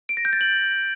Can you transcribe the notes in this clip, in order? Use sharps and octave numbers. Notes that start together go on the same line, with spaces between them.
D7
A#6
G6
A6
F#7